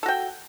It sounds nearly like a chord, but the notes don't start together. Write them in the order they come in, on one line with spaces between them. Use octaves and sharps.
A4 F#4 G5